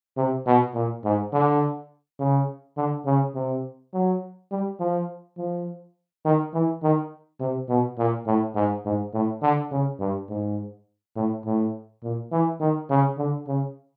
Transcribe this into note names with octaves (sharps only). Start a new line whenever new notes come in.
C3
B2
A#2
G#2
D3
C#3
D3
C#3
C3
F#3
G3
F3
F3
D#3
E3
D#3
C3
B2
A#2
A2
G#2
G#2
A2
D3
C#3
G2
G#2
A2
A2
A#2
E3
D#3
C#3
D3
C#3